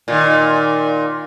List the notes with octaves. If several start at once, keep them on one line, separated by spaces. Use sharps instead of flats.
A#2 D#3